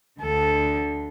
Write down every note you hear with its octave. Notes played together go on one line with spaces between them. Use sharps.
D2 D3 A4